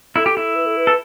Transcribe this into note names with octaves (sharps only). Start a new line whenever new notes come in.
E4 A4
G4
E4
B4
A4
B4
A4